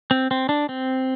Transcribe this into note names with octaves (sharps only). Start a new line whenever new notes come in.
C4
C4
D4
C4